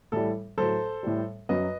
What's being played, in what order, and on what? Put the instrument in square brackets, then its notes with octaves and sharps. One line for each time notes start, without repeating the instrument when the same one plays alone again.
[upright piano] A2 E3 G3 A4
A2 F#3 A4 C5
A2 E3 G3
F#2 F#3 B4 D#5